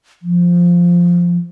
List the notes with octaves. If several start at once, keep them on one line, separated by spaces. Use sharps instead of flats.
F3